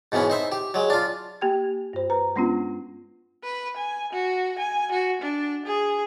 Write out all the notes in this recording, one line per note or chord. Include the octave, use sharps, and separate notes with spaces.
G#2 B2 E3 B3 C#4
D#4 C5 E5
G4
F#3 G#3
D4 F4
A#3 G4 G5 G#6
G2 C5
B4 A#5
G#3 B3 C#4 D4 F4
B4
G#5
F#4
G#5
F#4
D4
G#4